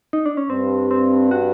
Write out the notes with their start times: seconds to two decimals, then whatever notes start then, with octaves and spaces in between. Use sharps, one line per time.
0.13 D#4
0.26 D4
0.37 C#4
0.50 G2 C4
0.91 C4
1.31 F#4